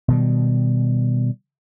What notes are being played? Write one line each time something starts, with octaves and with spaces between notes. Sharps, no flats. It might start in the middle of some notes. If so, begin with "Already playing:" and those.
B2 D#3 G3